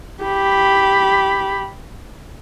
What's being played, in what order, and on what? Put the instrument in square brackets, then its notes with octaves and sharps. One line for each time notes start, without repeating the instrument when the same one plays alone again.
[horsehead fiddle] G4 B5